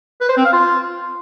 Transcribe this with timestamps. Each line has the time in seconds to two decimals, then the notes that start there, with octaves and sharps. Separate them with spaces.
0.21 B4
0.29 C5
0.37 C4
0.45 F5
0.53 F4